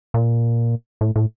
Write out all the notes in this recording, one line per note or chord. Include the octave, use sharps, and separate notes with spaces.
A#2
A2
A2